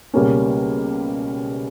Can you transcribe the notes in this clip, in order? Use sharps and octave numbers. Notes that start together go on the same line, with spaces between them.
C#2 B2 G3 A#3 C#4